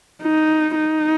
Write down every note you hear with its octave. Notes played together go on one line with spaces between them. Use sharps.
D#4
D#4